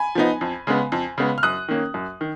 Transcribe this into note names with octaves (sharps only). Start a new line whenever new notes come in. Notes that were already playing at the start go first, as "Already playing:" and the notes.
Already playing: G#5 B5
F3 B3 D#4
F2
C#3 G#3 B3
F2
C#3 G#3 B3
F6
F#2 D#6 F#6
D#3 A#3 C#4
F#2
D#3